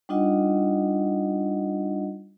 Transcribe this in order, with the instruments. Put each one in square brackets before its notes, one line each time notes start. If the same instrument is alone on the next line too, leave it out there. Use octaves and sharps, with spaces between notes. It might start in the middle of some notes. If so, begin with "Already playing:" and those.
[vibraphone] G3 D4 D#4 F4 D#5 F#5